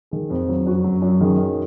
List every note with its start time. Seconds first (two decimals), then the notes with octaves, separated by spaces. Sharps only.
0.11 D#3 G#4
0.30 F2
0.49 F#3
0.66 F#2 F#4
0.84 F#3
1.02 F#2
1.20 D#3 G#4
1.38 F#2